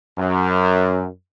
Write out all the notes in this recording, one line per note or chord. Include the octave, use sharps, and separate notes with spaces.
F#2